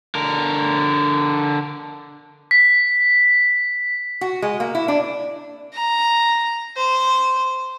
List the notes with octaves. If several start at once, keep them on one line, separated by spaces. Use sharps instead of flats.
D3 A#4
B6
F#4
G#3
A#3
E4
D4
A#5
C5